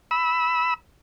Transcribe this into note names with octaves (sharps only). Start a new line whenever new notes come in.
B5 E6